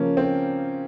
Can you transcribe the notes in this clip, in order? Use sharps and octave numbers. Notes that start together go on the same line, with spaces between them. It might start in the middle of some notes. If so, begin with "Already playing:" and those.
Already playing: C#3 F3 A#3 C#4
C4